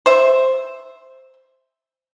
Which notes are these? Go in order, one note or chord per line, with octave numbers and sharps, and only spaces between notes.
C5 E5